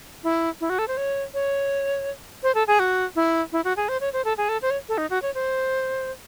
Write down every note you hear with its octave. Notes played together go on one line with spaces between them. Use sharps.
E4
E4
F#4
A4
C5
C#5
C#5
C5
A4
G#4
F#4
E4
E4
F#4
G#4
C5
C#5
C5
A4
G#4
A4
C5
C#5
A4
D#4
F#4
C#5
C5